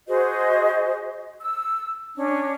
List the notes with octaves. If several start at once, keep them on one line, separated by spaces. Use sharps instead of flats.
F#4 G#4 C5 D#5
E6
C#4 D4